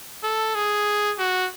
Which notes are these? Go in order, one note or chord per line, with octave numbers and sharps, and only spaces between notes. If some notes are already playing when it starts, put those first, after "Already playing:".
A4
G#4
F#4